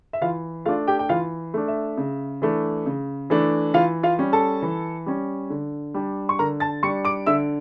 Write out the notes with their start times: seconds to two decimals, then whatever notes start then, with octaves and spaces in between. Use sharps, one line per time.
0.13 E5
0.22 E3 F4 F5
0.66 A3 F4 F5
0.69 D4
0.87 G4 G5
0.99 G5
1.09 E3 F4 F5
1.54 A3 D4
1.68 E5
1.97 C#3
2.42 E3 A3 D4
2.86 C#3
3.30 E3 A3 D4
3.74 E3 F4 F5
4.03 F4 F5
4.19 G3 C#4
4.33 A4 A5
4.62 E3
5.06 G3 C#4
5.50 D3
5.94 G3 D4
6.29 C#6
6.39 D3 A#4 A#5
6.60 A5 A6
6.83 G3 D4 C#6 C#7
7.05 D6 D7
7.26 D3 E5 E6